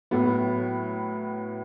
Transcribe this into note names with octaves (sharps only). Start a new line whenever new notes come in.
A2 F#3 B3